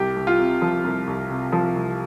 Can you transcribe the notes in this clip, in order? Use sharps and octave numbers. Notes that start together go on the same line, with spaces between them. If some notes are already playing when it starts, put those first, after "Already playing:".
Already playing: C2 G4
C2
F4
C3
F3
C2
C2
C3
F3
C2